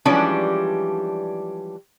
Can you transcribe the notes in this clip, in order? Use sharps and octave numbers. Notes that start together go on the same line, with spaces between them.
E3 F3 G3 G#3 C#4 D4